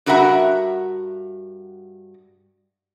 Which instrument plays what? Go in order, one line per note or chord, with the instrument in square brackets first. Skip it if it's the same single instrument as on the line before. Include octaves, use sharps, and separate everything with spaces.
[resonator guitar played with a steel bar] G2 F#4 A#4 E5 F#5 A#5